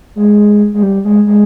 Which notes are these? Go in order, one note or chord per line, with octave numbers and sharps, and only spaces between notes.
G#3
G#3
G3
G#3
G#3